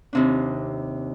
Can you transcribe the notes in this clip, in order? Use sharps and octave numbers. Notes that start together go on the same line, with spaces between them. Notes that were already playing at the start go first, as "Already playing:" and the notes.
D#2 C3 D4